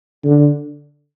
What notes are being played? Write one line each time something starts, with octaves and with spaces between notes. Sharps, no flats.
D3